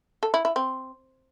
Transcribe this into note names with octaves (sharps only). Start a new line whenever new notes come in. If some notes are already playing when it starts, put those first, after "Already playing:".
A4
E4
E4
C4